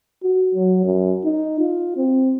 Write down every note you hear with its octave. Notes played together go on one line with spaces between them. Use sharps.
F#4
F#3
F#2
D#4
F4
C4